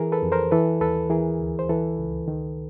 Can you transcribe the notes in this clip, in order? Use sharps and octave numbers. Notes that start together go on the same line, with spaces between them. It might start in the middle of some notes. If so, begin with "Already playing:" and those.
Already playing: E3 G#4 A#4
A4 B4
F2
A#4 C5
E3 A4 B4
D#2 A4 B4
E3 G#4 A#4
D2
C5
E3 A4 B4
C#2
D#3